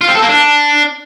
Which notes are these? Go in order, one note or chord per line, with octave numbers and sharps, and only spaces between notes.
F4
C4
A4
A#3
D4